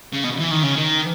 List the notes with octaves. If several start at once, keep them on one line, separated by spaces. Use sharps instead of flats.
C#3
B2
E3
D#3
C#3
D#3